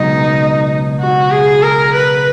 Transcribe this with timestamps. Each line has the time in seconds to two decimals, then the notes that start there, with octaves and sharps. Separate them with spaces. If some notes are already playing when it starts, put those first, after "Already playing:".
Already playing: C#2 B2 F#3 D#4
1.00 F#4
1.31 G#4
1.62 A#4
1.94 B4